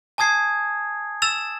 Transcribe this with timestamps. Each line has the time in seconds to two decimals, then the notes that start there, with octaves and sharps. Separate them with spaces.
0.18 G#5 A5 D#6 G#6 C7
1.22 E6 A6 E7 F7